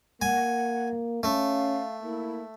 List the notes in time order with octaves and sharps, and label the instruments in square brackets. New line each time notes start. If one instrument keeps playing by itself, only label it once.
[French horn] A#3 [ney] F#5 [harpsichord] G#5
[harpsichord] A3 [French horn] C#4 [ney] F5
[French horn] A#3 [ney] E4